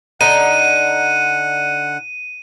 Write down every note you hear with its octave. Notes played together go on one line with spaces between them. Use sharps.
D3 D#4 F#5 D#7